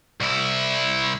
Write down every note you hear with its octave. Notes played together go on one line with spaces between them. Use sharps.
C2 E4